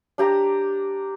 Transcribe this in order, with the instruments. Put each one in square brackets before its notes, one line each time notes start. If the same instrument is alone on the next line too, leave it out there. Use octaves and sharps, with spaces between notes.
[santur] D4 G4 A#5